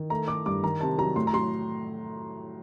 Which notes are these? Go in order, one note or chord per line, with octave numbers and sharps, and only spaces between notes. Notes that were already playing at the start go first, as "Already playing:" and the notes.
Already playing: D#3
A3 A#5
A3 D6
G2 D6
D#3 A#5
C3 A5
F#3 A#5
A2 C6
A#5
F#3 C6